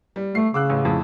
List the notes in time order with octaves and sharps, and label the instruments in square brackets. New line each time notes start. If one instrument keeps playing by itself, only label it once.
[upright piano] G3
[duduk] A3 [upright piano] C7
[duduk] C#3 [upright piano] D6 E6 F#6
[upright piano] A1
F2 A2